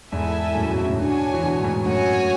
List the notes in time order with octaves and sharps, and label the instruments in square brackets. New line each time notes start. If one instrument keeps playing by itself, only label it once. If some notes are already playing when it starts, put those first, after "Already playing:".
[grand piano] E2 G#2 [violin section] E4 A4 E5 G#5
[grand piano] F#2 A2
G#2 B2
A2 C#3
[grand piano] B2 D3 [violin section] D4 F#4 C#5 G#5
[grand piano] E3
B2 D3
A2
G#2 B2
[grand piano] F#2 A2 [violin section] F#4 C#5 G#5
[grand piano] A2